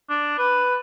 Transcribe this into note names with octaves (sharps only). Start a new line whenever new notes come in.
D4
B4